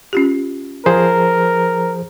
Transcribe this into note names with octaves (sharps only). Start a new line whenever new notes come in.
C#4 F4 G4
F3 G#4 A#4 C5